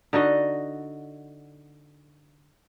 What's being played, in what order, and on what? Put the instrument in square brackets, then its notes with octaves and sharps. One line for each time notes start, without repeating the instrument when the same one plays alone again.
[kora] D3 D#4 F#4 D#5